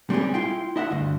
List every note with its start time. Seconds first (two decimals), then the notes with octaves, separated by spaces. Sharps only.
0.10 G3 C4 C#4 G4 G#4
0.34 E4 F4 G5
0.76 E4 D#5 E5 F#5
0.90 D2 G2